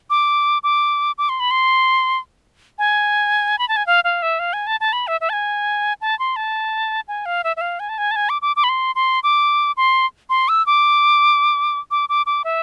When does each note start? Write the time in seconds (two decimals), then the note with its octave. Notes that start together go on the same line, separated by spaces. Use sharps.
0.10 D6
0.63 D6
1.18 D6
1.29 C6
1.40 B5
1.51 C6
2.79 G#5
3.59 B5
3.69 A5
3.76 G#5
3.87 F5
4.04 F5
4.22 E5
4.39 F5
4.53 G#5
4.67 A5
4.80 A5
4.93 B5
5.07 E5
5.21 E5
5.29 A5
5.33 G#5
6.01 A5
6.19 C6
6.36 A5
7.08 G#5
7.26 F5
7.44 E5
7.57 E5
7.61 F5
7.80 G#5
7.89 A5
7.98 G#5
8.11 A5
8.16 G#5
8.29 D6
8.42 D6
8.56 D6
8.64 B5
8.69 C6
8.95 C6
9.23 D6
9.77 C6
10.30 C6
10.49 E6
10.66 D6
11.91 D6
12.09 D6
12.26 D6
12.44 E5